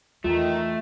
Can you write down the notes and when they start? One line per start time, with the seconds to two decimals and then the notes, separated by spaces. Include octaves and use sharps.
0.24 E2 D#3 A3 F4